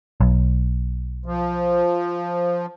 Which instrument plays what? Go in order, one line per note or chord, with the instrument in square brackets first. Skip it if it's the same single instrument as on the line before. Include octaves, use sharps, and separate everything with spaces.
[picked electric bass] B1
[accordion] F3